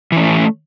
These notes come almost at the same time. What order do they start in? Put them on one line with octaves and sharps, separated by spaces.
E3 C#4 A3